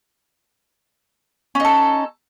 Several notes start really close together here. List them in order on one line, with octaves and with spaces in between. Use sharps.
C#4 D#4 A4